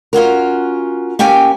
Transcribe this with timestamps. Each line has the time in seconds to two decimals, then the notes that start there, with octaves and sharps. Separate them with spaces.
0.13 C#4 F4 F#4 A#4
1.19 A#3 C#4 G4 G5 G#5